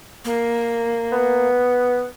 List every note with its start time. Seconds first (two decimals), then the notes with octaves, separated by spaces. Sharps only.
0.25 A#3
1.12 B3